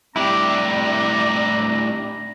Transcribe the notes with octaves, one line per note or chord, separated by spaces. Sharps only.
A2 G3 C4 D4 E4 G4 A#5